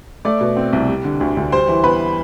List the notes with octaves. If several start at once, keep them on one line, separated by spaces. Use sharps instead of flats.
A3 D5 D6
B2
C4
C2
G3
D3
D2
D2
G3 C5 C6
E3
B3 B4 B5